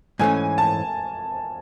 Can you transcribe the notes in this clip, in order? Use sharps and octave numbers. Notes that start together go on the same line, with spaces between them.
G#2 E3 A3 C#4 G#5
A5